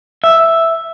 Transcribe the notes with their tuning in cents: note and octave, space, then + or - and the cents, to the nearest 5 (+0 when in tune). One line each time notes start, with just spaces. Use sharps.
E5 +0